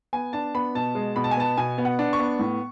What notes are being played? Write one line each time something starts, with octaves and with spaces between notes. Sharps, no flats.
B3 G#5
D4 A5
B3 B5
B2 A5
G#3
B2 B5
A5
G#5
B3 A5
B2 G#5
B3
F#5
D4
C#6
B3
A2